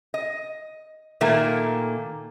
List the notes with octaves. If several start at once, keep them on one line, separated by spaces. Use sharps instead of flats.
D#5
A#2 D#3 A3 A#3